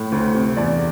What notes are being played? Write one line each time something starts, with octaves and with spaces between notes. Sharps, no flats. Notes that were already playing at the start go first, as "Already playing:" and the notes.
Already playing: A2
D2
C3
E2 D5